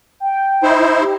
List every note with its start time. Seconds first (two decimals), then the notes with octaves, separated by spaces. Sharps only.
0.20 G5
0.63 D#4 E4 C5
1.00 G4